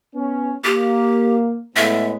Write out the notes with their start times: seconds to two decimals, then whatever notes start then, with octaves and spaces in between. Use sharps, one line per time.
0.15 B3 C#4
0.64 A#3 G4
1.76 A2 G#3 B3 E5